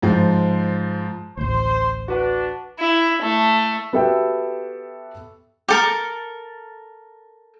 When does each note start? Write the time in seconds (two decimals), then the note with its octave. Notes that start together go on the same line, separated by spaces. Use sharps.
0.02 G#2 F3
1.37 A1 D2 C5
2.08 D4 F#4 B4 F#5
2.79 E4
3.21 A3
3.93 B3 F#4 G4 A4 E5 G5
5.68 G4 A4 A#4